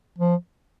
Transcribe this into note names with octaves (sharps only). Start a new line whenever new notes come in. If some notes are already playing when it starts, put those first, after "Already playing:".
F3